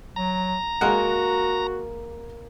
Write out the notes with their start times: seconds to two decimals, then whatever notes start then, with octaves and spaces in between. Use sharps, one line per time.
0.16 F#3 A#5
0.81 G#3 A#3 F#4 A#4 F#5